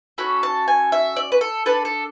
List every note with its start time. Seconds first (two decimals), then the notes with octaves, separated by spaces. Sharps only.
0.18 C#4 F#4 A4 B5
0.43 A5
0.68 G#5
0.92 E5
1.16 D5
1.32 B4
1.41 A4
1.66 D4 A4 B4
1.85 A4